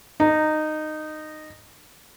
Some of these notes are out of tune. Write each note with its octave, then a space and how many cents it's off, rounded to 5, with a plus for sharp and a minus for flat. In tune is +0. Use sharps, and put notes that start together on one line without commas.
D#4 -15